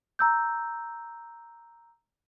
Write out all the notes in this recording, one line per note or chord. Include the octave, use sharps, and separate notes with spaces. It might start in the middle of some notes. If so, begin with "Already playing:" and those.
A#5 E6 G6